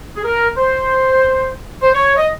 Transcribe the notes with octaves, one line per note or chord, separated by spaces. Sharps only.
G#4
A#4
C5
C5
C#5
D#5